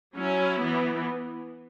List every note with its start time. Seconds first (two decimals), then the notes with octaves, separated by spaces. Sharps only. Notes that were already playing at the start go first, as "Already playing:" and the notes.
0.17 F#3 C#4 E4
0.60 E3 B3